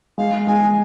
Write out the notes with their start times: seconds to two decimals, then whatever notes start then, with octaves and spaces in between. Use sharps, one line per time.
0.18 G#3 F5
0.47 G#3 G#5